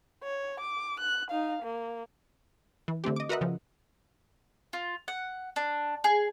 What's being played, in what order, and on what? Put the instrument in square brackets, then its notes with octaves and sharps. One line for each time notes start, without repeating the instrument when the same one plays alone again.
[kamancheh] C#5
D6
F#6
D#4 F5
A#3
[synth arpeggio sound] E3
D3 A3 C4 G4
D#5 D6
F#4 A#4 B4 D#5 E5 F#5
C#3 F3
[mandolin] F4
F#5
D4
G#4